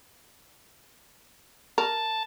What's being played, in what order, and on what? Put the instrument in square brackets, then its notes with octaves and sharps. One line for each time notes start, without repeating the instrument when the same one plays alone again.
[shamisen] A#4 [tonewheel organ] A5